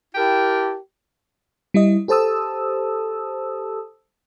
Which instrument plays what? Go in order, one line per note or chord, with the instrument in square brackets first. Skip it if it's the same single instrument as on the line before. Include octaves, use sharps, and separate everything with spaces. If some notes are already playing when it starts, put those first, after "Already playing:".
[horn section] E4 G4 A#4 G5 A5
[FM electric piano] G3 E4 D#5
G4 A4 C5 A5 D#6 E6